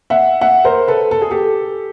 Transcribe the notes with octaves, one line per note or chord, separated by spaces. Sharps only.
E5 F#5
E5 F#5
A#4 C5
A4 B4
A4
G#4
G4 A4